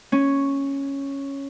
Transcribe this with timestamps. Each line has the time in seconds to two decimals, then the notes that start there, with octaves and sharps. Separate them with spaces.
0.12 C#4